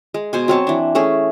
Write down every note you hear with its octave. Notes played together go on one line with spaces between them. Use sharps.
G#3
B2 C5 G#5
F#3 C4 C#5 A5
E3 D4
A3 C#4 G#4